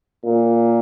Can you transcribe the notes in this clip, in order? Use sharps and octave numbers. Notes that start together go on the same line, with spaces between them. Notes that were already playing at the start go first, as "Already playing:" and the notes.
A#2